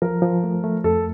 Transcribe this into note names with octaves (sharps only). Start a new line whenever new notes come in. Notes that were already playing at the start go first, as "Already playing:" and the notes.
F3 A#4
F3
A3
A3
F2 A4